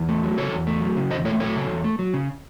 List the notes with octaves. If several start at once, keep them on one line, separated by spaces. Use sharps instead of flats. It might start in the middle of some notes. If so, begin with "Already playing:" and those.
Already playing: E2
A3
F#3
C#3 A4 C#5
E2
A3
F#3
C#3
E2 C5 D#5
A3 A4 C#5
F#3 A4 C#5
C#3
E2
A3
F#3
C#3